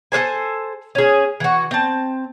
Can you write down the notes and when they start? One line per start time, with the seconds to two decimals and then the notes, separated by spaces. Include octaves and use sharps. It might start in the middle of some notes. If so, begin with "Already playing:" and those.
0.12 A4 B4 C5 G#5
0.95 C#4 G#4
1.40 E3 F#4
1.71 C4 A5